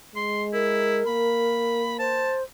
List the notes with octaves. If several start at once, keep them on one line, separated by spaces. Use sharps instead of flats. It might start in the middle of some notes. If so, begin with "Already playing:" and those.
G#3 C6
E4 A#4
A#3 B5
C5 A5